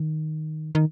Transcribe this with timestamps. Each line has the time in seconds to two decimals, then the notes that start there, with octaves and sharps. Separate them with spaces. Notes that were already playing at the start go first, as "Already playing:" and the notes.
Already playing: D#3
0.75 D#3